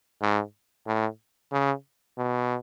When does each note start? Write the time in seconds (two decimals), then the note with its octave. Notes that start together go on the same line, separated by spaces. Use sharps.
0.21 G#2
0.87 A2
1.52 C#3
2.18 B2